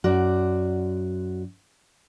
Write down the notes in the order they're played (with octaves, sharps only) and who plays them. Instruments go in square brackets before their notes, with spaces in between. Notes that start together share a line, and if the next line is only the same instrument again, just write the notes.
[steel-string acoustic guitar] F#2 F#4 D5